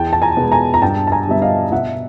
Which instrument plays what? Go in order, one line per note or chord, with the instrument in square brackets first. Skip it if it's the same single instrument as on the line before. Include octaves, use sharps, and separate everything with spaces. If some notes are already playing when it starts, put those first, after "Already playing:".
Already playing: [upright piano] E2 G5 A5
A5
G#5 A#5
B2 G#3 B3
G#5 A#5
A#5
G2 G5 A5
A5
G#5 A#5
D3 G3 B3 E5
D#5 F5
B2 E5 F#5